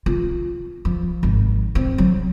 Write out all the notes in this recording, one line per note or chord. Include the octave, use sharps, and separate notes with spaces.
F4
F3
G#1
C4
F#3